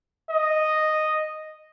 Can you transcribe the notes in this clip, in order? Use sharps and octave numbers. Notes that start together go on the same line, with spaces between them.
D#5